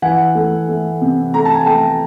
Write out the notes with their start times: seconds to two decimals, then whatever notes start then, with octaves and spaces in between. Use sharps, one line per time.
0.02 E3 F#5 G#5
0.35 A3
0.69 A3
1.02 C3
1.34 A3 A#5
1.45 A5
1.55 G#5
1.66 A3 G5 A5